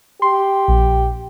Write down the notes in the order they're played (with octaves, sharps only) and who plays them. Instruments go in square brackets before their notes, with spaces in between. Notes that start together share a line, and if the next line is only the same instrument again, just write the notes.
[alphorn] G4 [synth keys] C6
[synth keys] A#1